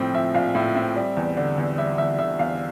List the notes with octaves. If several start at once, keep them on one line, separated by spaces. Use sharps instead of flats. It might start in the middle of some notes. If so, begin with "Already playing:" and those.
Already playing: A#1 A2 F3 C4
F3 E5
A#1 F5
A2 E5
C4 E5
G3
E2
D3
E2
G3 E5
E2 E5
D3 E5
E2 F5